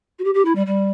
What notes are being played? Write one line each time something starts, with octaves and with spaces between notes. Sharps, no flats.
F#4
G4
G4
E4
G3
G3